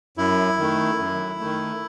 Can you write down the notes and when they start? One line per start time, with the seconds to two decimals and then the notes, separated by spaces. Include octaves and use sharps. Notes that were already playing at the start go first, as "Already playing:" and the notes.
0.17 F#2 E4
0.59 D#3 A3
0.99 F#2
1.40 D#3 A3